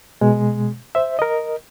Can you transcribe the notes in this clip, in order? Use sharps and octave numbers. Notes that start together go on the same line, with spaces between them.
B2 G#3
C5 E5
A#4 D#5